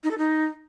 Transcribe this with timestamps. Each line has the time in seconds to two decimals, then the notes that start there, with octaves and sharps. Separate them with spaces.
0.04 D#4
0.11 A4
0.18 D#4